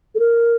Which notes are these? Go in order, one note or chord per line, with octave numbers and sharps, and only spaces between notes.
A4
A#4